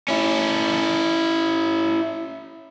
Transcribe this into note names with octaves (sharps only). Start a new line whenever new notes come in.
C#4 E4